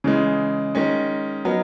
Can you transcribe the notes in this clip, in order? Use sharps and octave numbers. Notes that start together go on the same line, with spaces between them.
C#3 E3 G#3
D#3 G#3 C#4
F#3 B3 D#4 A#4